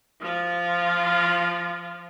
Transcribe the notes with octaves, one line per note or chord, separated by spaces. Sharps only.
F3 F4